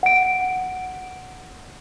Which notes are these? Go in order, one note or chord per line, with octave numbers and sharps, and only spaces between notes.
F#5 D7